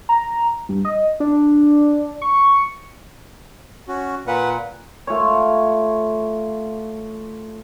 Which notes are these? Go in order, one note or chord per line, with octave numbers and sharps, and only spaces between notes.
A#5
G2
D#5
D4
C#6
C#4 F#4
A#2 B4 F#5
A3 F4 C#5